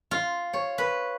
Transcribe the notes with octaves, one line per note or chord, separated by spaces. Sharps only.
F4
C#5
B4